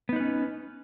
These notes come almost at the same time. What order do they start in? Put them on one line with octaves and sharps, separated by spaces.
B3 D#4 B4 C#4